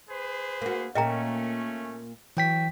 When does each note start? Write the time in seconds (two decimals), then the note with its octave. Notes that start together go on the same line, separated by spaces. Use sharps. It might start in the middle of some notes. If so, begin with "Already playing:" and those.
0.10 G#4 B4 C5
0.61 A#3 F#4
0.95 A#2 A3 A#3 C#4 D#5 G5 A#5
2.37 E3 F#3 G5 B6